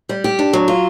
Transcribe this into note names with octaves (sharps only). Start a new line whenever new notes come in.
G3
G4
D4
F#3
F4